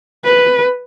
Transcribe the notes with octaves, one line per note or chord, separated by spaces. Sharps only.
B4